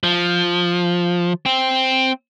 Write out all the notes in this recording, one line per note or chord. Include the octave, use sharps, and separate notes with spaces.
F3
C4